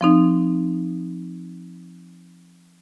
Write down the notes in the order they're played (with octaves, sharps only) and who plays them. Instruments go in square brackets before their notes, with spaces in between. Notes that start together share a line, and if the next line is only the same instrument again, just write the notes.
[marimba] F3 C4 D#4